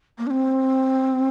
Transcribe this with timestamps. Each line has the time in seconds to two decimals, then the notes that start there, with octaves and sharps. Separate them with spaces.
0.18 A#3
0.27 D4
0.30 C4